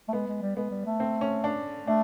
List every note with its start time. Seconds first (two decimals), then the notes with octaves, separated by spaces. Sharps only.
0.08 A3
0.13 G#3 B3
0.27 G#3
0.42 G3
0.56 G#3 B3
0.71 G3
0.85 A3
1.00 C4
1.21 C#4
1.44 D4
1.87 A3 D4